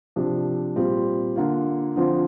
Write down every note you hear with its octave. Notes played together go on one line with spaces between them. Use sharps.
C3 F3 D4
A#2 G3 C4 F4
D3 A#3 F4
D3 F3 C4 F4